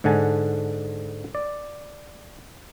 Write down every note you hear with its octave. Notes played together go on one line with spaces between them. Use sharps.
G#2 D3 F#5 G#5 A5
D5